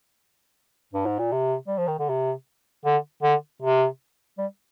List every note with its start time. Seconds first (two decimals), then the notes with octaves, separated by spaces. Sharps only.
0.93 G2
1.06 G#2
1.19 A#2
1.32 C3
1.68 G3
1.78 F3
1.88 D#3
1.99 D3
2.09 C3
2.85 D3
3.23 D3
3.62 C3
4.38 G3